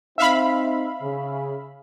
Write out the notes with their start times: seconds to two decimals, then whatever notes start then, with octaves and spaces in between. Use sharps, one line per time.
0.18 C4 D#4 E5 F5 B5
1.02 C#3